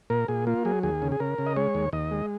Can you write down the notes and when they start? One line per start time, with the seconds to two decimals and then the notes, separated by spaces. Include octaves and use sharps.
0.10 A#2 A#4
0.28 A#2 G#4
0.47 A#3 F4
0.65 F#3 G#4
0.83 D#2 G#4
1.02 C#3
1.12 G#4
1.20 C#3 A#4
1.38 C#3
1.46 D#5
1.56 G#3 C#5
1.75 D#2
1.93 D#2 D#5
2.11 G#3